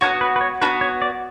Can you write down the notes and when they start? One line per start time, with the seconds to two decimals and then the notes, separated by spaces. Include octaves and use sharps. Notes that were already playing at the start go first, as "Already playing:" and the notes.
0.01 B3 D4 F#4 C#5
0.21 B4
0.36 B4
0.41 C#5
0.62 B3 D4 F#4 B4
0.81 C#5
1.02 D5